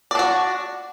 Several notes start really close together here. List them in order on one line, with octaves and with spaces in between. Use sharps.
D5 D4 F#4